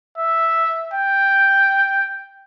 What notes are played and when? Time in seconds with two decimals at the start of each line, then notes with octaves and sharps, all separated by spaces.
0.18 E5
0.94 G5